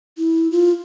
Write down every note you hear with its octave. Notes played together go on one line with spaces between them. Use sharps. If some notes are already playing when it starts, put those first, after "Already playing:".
E4
F4